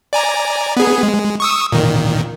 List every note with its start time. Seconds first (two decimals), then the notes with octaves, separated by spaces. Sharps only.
0.13 D5 G#5 A#5
0.77 B3 G#4
1.03 G#3
1.40 C#6 D#6 E6
1.72 A#2 D#3